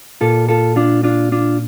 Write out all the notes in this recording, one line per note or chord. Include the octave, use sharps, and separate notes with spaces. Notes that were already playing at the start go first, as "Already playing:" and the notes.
A#2 F4 A4
F4 A4
D4 F4
D4 F4
D4 F4